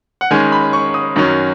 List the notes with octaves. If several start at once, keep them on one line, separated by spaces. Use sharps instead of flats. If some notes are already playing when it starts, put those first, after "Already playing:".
F#5
D#3 G#3 C#4 G#5
B5
C#6
D#6
F#2 D#3 F#3 C#4